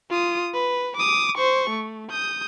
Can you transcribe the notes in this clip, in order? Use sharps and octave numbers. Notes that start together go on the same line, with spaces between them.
F4 D#6
B4
D6 D#6
C5 C#6
A3
D#6 G6